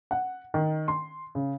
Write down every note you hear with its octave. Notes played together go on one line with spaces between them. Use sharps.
F#5
D#3
C6
C#3